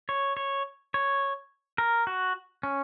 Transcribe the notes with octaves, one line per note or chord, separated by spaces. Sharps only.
C#5
C#5
C#5
A#4
F#4
C#4